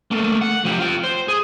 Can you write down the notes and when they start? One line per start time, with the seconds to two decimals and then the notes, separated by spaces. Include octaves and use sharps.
0.11 A3 A#3
0.41 F#5
0.65 F3 G4
0.79 F4 G5
1.04 C5
1.28 G#4